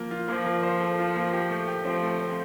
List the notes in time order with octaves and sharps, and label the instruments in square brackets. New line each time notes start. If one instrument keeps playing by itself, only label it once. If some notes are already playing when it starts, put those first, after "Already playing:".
Already playing: [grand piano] F3 A#3
F4
[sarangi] F3 [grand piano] A#3
[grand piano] A#3
C5
A4
F4
A#3
G4
A3
G4
[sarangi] F3 [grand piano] C4
[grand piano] A3
C4